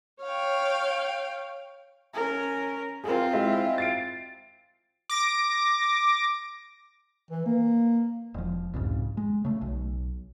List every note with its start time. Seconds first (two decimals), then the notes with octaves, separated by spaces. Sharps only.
0.23 C#5 F5 G5
2.14 C#4 A#4
3.04 C4 F4 G#4 A#4
3.34 G#3 E4 E5
3.78 A6 C7 D7
5.10 D6 A#6 D7
7.31 E3
7.46 A#3
8.34 E1 F3
8.74 C2 F2 G#2 C#3
9.17 G#3
9.45 C#3 A3
9.61 B1